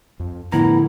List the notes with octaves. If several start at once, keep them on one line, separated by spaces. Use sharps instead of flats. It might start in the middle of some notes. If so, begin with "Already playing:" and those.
F2
A2 D3 F3 B3 E4 A#5